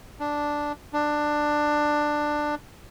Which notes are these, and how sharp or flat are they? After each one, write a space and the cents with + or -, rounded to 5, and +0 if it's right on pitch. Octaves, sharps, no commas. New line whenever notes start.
D4 +0
D4 +15